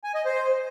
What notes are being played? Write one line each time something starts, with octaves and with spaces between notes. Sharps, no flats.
G#5
D#5
C5